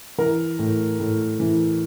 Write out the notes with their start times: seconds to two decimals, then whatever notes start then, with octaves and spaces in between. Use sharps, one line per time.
0.18 E3 A#4
0.59 A2
1.00 A2
1.40 E3